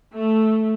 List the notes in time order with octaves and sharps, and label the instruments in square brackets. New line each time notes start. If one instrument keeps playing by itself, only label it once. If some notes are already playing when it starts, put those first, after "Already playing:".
[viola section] A3